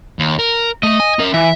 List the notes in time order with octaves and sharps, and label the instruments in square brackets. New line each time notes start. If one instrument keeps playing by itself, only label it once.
[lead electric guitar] D#2
A#4
[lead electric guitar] A3 [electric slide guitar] D#5
[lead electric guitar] G#5
C#4 A#4
[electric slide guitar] E3 [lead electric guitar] E5